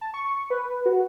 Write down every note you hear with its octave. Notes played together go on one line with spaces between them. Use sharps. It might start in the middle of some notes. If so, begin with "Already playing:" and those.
A5
C#6
B4
F#4